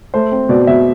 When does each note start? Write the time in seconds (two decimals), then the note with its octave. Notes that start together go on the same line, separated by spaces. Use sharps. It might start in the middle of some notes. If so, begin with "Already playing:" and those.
0.14 A3 C5
0.32 C4
0.49 B2 D5
0.67 B2 E5